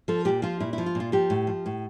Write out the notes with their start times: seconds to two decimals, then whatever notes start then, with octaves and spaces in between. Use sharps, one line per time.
0.08 F3 A4
0.25 A#2 G4
0.42 F3 F4
0.60 A#2 E4
0.73 E4
0.78 F3
0.86 F4
0.95 A#2
1.00 F4
1.12 F3 G4
1.30 A2
1.47 F3
1.66 A2